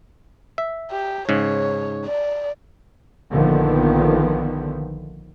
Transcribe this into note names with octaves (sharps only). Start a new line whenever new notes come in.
E5
G4
G#2 C#3 C#5
D5
A#1 D3 D#3 F3 B3